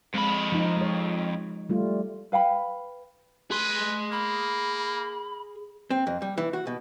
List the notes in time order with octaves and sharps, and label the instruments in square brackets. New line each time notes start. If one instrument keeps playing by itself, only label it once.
[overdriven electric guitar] F2 B5 [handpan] G#3
[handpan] F3 D#4
G#3 C#5
G3 A3 F4
[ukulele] B4 F5 G5 B5
[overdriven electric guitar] G#4 C6 [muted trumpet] B4
[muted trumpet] A#3 [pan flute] B5
[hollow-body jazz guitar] C4
F2
G3
E3
F#4
B2